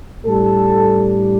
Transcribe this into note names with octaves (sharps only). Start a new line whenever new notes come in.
A2 G3 D4 A4